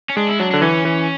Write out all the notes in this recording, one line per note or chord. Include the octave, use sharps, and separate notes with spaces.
C#4
G#3 D4
E4
F#3 D4
D3 D4
E3 C#4
E3